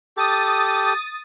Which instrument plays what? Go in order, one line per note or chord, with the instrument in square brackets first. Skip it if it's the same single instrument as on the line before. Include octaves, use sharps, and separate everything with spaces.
[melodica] G4 A4 [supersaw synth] D#6 A6